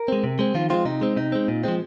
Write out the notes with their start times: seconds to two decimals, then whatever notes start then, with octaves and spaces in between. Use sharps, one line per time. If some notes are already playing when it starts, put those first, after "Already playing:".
Already playing: A#4
0.08 G#3 C4
0.24 C3
0.39 G#3 C4
0.55 D#3 F3 F4
0.70 F3 G#3 C4 F4
0.85 C3 D#4
1.01 G#3 C4
1.16 C3 D#4
1.32 G#3 C4
1.48 A#2
1.64 F3 G#3 C4